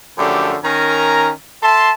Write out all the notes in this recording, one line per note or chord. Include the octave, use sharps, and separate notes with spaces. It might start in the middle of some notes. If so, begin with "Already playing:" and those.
F#2 D3 F3 A3 G4
D#3 C#4 A#4 G#5 A#5
A4 E5 A5 C6